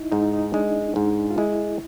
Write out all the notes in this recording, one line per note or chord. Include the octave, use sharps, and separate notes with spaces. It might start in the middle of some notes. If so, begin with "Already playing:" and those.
Already playing: D#4 E4
G#2 D#4
D#4
G#3 D4
G#2
F4
G#3 E4